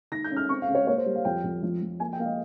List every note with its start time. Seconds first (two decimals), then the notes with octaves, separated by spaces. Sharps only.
0.12 D#3 A#6
0.24 G6
0.31 C#4
0.37 F6
0.49 C4 C#6
0.62 F5
0.68 C#3
0.75 C#5
0.87 A#3 C#5
0.97 C5
1.06 G3
1.15 F5
1.25 F2 G5
1.44 F2
1.63 F3
1.82 F3
2.00 A#3 G#5
2.13 G5
2.19 A#3 F5
2.25 D#5